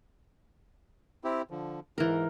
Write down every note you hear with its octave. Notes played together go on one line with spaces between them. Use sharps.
C4 E4 G4
D3 F3
G#2 E3 A#4